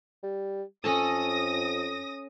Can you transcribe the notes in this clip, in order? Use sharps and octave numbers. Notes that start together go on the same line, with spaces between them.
G3
F2 C#4 A4 A5 D#6 A#6